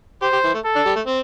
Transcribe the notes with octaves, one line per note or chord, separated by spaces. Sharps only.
G4 C5
G4
E3
A3
A4
D4
G3
A3
C4